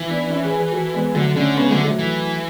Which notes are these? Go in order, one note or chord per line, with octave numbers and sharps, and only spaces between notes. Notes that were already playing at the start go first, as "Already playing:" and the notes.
Already playing: E3
B3 D4
D4
C#4 E4
G#4 B4
G#4 B4
F#4 A4
G#3 B3
D3 F#3 A3
D3 A3 C#4
C#3 G#3 B3
D3 F#3 A3
F#3 A3
E3